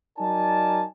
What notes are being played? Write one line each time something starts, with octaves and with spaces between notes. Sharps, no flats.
F#3 D#4 A#4 D5 G#5 A5